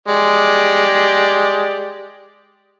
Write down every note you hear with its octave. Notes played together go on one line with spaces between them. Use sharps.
G#3 G4 D5